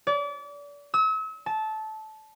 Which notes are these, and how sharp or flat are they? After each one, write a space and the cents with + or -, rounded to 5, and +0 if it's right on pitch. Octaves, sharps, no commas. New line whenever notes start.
D5 -35
E6 -40
A5 -15